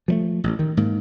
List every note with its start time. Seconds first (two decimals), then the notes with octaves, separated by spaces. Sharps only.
0.08 F3 F#3 A3
0.44 A1
0.59 D#3
0.77 G#2 A#3